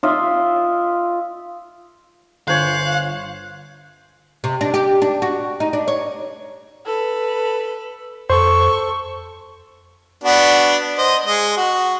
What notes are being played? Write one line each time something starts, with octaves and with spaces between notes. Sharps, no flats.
F4 D#5 E5
G1 F4 C5 C#5 F5 G#5 F#6
C3
D4
G4
D4
F#4
D#4
D4
C#5
A4 B4
F2 A4 C5 C#6
B3 D4 F#4
C5 D#5
G#3 D#5
F#4